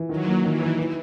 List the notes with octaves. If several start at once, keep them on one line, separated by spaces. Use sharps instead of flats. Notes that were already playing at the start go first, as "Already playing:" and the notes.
Already playing: E3
D#3 F#3
A#3
D#3 E3
D#4
E3